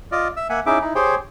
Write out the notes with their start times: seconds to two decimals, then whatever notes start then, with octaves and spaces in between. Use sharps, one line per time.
0.12 F4 D5 D#5
0.37 E5 E6
0.49 A#3 E5 F#5 G#5
0.66 C#4 D#4 E4 G#4 E5 D6
0.81 D#4 E4
0.95 G4 G#4 C5 C#5 G5